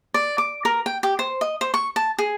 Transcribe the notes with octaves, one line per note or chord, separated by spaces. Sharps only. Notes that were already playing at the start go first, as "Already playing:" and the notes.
D5
D6
A#4
G5
G4
C5
D#5
C5
C#6
A5
G#4